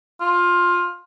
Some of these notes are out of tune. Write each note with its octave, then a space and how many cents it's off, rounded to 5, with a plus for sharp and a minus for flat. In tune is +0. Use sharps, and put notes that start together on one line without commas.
F4 +15